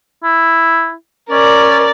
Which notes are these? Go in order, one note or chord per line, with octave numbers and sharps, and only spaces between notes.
E4
C#4 A#4 D5